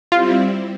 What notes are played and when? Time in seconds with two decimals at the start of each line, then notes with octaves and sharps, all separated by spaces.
0.12 G3 C4 E4 F4